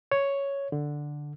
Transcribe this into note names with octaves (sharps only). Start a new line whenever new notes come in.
C#5
D3